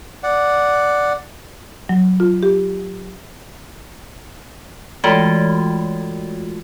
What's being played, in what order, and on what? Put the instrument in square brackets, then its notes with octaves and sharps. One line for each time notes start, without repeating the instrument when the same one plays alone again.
[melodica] D5 F#5
[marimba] F#3
F4
G4
[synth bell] E3 G#3 A3 F4 F#4